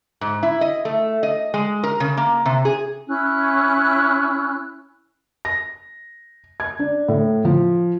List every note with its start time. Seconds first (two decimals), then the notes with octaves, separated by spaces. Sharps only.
0.21 G#2
0.43 E4
0.61 D#5
0.85 A3
1.23 D#5
1.54 G#3
1.84 A#4
2.00 C#3
2.17 A#3
2.46 C3
2.65 G#4
3.08 C#4 E4 E6 F#6
5.45 A#6
6.60 G#6
6.79 D4
7.08 A2
7.45 F3